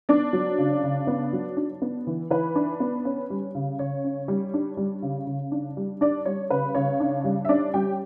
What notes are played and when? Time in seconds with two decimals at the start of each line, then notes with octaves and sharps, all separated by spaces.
0.09 B3 D4 D5
0.33 F#3
0.58 C#3
0.83 C#3
1.07 B3
1.33 F#3
1.57 D4
1.82 B3
2.07 E3
2.30 E3 B4
2.55 D4
2.80 B3
3.05 C#4
3.30 G3
3.55 C#3
3.79 C#3 C#5
4.04 C#4
4.28 G3
4.54 D4
4.77 G3
5.02 C#3
5.27 C#3
5.52 D4
5.77 G3
6.01 D4 D5
6.26 G3 C#5
6.50 C#3 B4
6.75 C#3 C#5
7.00 D4
7.24 G3
7.45 E5
7.49 C#4 D4 D5
7.74 G3 G4 G5